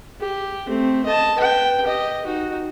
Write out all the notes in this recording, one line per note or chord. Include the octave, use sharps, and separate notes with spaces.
G4
A3 C4
D#5 A5
B4 G5
G4 D#5
D#4 F#4